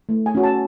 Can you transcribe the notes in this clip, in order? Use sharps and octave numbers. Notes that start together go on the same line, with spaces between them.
A3
G#5
C#4 F#4
A5